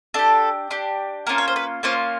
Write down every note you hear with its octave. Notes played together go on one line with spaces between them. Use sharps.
D4 G4 A4
D4 G4
A#3 C#4 F4 A#4
C#5
C5
B4
A#3 C#4 F4 C5